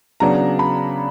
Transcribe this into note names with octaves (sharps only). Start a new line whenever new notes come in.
C#3 F#3 B3 D4 A#5
B5